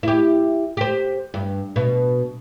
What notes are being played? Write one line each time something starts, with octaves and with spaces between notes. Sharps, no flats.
E4 G4
G4 C5
G2
B2